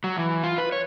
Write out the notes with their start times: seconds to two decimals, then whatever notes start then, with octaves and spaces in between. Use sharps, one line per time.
0.04 F#3
0.17 E3
0.43 F4
0.58 B4
0.72 C#5